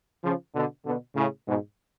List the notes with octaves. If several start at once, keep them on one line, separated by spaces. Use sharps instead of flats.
C#3 F3
B2 D3
B2 D3
A2 C#3
G#2 B2